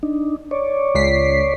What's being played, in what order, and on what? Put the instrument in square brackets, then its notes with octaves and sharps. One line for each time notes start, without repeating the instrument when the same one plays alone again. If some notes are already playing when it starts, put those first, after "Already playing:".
[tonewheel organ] D4 D#4
C#5 D5
[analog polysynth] C#2 B6 C7